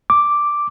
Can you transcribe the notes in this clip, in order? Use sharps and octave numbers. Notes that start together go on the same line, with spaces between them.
D6